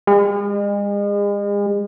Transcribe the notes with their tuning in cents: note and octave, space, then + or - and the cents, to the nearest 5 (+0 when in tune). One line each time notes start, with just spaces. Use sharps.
G#3 -40